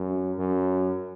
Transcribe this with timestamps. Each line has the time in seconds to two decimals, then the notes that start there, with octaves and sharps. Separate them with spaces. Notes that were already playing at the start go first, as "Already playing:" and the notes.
Already playing: F#2
0.39 F#2